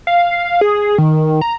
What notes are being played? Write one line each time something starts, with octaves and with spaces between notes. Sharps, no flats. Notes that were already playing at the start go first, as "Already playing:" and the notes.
F5
G#4
D#3
A#5